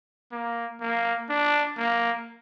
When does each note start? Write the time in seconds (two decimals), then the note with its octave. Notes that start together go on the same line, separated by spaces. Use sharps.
0.32 A#3
0.80 A#3
1.29 D4
1.78 A#3